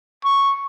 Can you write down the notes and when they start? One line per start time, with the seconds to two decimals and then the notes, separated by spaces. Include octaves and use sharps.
0.24 C#6